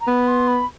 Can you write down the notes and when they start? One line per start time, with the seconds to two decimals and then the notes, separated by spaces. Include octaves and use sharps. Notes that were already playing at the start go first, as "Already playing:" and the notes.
0.01 A#5
0.07 B3 B5
0.28 C6
0.48 B5